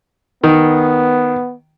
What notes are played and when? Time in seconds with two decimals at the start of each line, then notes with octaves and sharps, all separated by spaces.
0.44 D#3 B3